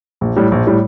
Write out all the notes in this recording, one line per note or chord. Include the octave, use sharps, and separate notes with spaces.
A#1
A2 G3
A#1
A2 G3